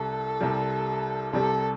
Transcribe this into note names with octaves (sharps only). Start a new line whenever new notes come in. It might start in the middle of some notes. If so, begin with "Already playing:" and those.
Already playing: C2 C3 G3 A4
C2 C3 G3
C2 C3 G3 A4